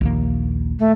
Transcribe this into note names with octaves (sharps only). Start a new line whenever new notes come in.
A#1 D#2 A#3
A3